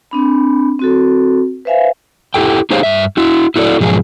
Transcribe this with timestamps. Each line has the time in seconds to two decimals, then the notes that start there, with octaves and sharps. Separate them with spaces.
0.11 C4 D4 B5
0.79 C4 F#4 A4
1.65 B4 C5 E5 F5 G#5
2.34 E4 G4 A4 G5
2.71 D#4 G4 G#4 C5 C#5 F5
2.83 G2 E5
3.17 E4 F#4
3.56 E4 F#4 A4 C5 D5
3.81 G#2 B2 F3 F#3 G#4